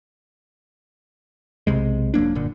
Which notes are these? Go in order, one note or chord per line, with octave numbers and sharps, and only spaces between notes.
B1 E2 C3 G#3
E1 F#3 A#3 D4
F#1 A#2 D3